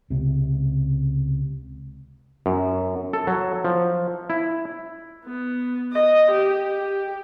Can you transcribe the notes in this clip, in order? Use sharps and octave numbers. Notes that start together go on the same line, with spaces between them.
C#2 C3
F#2
A4
F#3
F3
E4
B3
D#5
G4
G4